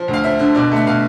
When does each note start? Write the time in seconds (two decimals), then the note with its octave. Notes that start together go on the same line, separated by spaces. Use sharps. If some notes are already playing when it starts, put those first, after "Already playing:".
Already playing: F3
0.08 D2
0.13 F5
0.24 F3 E5
0.39 D3
0.55 B2 D5
0.71 A3 E5
0.87 B2 F5